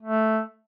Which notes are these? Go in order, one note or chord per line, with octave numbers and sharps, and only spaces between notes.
A3